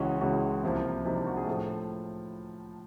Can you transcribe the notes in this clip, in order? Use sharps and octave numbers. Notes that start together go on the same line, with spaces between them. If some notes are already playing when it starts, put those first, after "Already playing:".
Already playing: C#2 C#3 E3 G#3 C#4 F#4
C#2 C#3 E3 G#3 C#4 F#4
C2 C3 F3 A#3 E4
C2 C3 F3 A#3 D#4
D4
F#4
G#4
A2 F3 A4